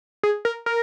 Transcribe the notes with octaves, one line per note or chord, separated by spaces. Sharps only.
G#4
A#4
A#4